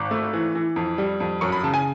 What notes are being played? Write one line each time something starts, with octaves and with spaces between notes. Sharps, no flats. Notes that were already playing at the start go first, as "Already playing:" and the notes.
Already playing: G#1 D6
A3
E3
E3
F2
G3
F2
F#2 C#6
B5
C#3 A5
G#5